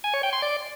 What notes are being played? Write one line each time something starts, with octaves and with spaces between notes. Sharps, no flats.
G#5
C#5
G5
C6
D5